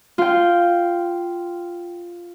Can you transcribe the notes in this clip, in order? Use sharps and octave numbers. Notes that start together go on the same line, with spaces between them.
F4 G5